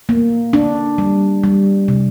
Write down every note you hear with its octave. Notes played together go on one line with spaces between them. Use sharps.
A#3
D4
G3
G3
C3